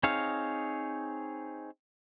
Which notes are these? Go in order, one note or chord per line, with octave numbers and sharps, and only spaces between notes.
C4 D#4 G#4 C#5 F5